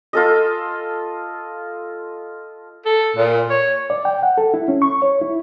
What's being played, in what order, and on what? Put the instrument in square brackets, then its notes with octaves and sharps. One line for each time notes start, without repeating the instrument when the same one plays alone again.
[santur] F4 A4 D#5
[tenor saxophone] A4
A#2
C#5
[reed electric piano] D5
G5
F#5
A4
E4
C#4
C#6
C#5
E4